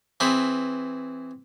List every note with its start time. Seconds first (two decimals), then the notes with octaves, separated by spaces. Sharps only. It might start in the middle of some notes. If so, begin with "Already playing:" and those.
0.20 E3 C4 G#4 B4